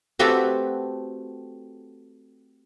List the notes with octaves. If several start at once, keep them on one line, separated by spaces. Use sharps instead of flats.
A3 C4 F#4 G4 A4 B4